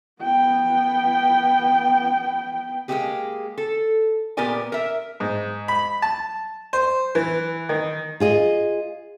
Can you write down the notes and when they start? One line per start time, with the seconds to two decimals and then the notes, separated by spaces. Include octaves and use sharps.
0.23 B3 G5
2.88 G#3 A#3 C4 D#4 G4 G#4
3.58 A4
4.37 A#2 B3 G4 A#4 D5 G#5
4.72 A#4 E5
5.20 G#2
5.68 B5
6.02 A5
6.73 C5
7.15 E3
7.69 D#3
8.20 F4 G#4 D#5